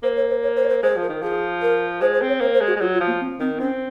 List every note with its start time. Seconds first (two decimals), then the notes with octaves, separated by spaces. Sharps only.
0.03 A#3 C5
0.17 C#5
0.30 C5
0.43 C#5
0.56 C5
0.64 C#5
0.69 C5
0.83 G#3 C5
0.96 F3
1.02 A#4
1.09 D#3
1.22 F3 G#4
1.62 A#4
2.01 G#3 C5
2.14 C5
2.22 C4
2.28 C#5
2.41 A#3 C5
2.54 C5
2.61 G#3
2.67 F#4
2.76 G#3
2.81 F#3 F4
2.94 F4
3.00 F3
3.07 A#3
3.20 C4
3.39 D#3 C4
3.59 C4 C#4